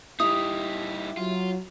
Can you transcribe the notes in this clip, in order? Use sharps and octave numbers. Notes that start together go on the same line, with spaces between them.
G3 D#4 E4 G4 D#6
F#3 F4